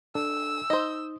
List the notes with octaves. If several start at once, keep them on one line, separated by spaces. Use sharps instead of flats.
D4 A4 E6
D#4 C5 D#5